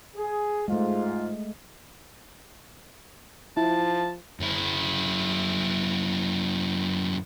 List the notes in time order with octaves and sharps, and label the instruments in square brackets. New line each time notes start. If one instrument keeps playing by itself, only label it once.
[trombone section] G#4
[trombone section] G#2 F4 [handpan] G#3 A3
[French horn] F3 [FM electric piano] E4 [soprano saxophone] A5
[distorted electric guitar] F#2 E4